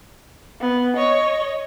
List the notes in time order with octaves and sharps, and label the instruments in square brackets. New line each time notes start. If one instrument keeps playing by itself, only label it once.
[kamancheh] B3
C#5 D#5